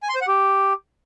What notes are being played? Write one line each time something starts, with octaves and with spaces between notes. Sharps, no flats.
G#5
C6
C5
F#5
G4